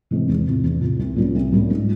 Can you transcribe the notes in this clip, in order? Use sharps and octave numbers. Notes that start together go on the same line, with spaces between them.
C3 E3 G#3 C4
E2
C3 F3
E2
C3 F3
C2
A#2 G3 C#4
C2
A#2 G3 C#4
G#2